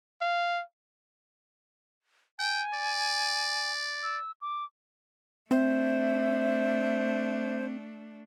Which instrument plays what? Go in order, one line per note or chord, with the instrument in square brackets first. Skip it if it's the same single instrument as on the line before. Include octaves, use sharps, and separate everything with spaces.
[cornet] F5
[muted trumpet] G5 [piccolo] G#5
[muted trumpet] D5
[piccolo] E6
D6
[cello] A3 D4 [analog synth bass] C4 [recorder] C5 [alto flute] E5